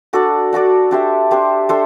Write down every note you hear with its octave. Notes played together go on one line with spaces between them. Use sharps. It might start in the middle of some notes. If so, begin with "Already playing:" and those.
D4 F#4 A4 D5
D4 F#4 A4 D5
D4 G4 C5 E5
D4 G4 C5 E5
D4 A4 C5 E5